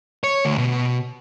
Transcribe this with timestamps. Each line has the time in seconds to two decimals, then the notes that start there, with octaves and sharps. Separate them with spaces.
0.24 C#5
0.45 D2
0.58 B2